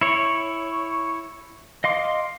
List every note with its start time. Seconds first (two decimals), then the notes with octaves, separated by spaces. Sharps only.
0.01 E4 C#5
1.84 D#5 F5 C6 D6